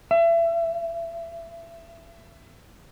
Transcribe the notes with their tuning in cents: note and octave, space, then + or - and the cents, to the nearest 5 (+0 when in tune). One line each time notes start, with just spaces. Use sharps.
E5 +30